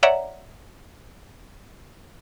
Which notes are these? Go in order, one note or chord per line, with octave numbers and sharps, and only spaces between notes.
C#5 D5 E5 F#5 A#5